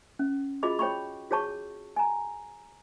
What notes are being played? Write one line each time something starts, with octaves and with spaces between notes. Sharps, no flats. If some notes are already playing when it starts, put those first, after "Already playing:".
C#4
F4 F#4 G#4 D#5 B5 D6
C#5 G5 B5 C#6
F#4 G#4 C#5 A5 C#6
G#5 A#5